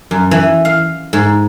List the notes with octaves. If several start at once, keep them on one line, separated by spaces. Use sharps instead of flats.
F#2
E3
F5
G#2